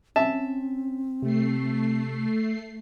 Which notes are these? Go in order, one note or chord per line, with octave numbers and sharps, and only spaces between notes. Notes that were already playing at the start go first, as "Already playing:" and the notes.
C4 C#4 E5 A5
C3 A3 C7